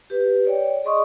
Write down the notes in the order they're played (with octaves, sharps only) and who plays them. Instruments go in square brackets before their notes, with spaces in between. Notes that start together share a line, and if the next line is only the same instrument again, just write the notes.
[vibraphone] G4 B4
C#5 D5 G5
G#4 D5 D#5 C6 C#6 D#6